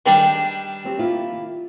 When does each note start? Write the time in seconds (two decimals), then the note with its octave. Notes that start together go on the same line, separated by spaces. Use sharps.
0.06 D#3 G3 D4 G#4 D#5
0.84 F#3 C4 G4
0.99 A#3 E4 F4